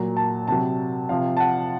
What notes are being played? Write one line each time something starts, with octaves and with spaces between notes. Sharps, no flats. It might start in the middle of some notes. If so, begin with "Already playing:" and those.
Already playing: A#2 F#3 A#5
A5
C3 F#3 A5
C3 F3 F5
A5
F#5